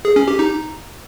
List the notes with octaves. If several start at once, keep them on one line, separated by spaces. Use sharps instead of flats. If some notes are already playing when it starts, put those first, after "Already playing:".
G#4
C#4
G4
D#4